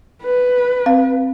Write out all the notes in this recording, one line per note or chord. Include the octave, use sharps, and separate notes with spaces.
B4
C4 F5